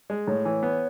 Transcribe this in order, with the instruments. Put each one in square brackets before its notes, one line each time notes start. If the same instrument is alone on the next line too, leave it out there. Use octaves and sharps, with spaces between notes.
[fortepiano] G#3
[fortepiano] A2 [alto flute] C#5
[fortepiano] E3
B3